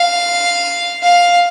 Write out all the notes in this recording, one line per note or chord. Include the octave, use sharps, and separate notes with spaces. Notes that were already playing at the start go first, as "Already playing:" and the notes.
Already playing: F5
F5